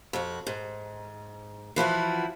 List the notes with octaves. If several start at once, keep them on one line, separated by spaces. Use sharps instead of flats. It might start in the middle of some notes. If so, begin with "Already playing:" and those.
F2 F#4
G#2
E3 F3 E4 F#4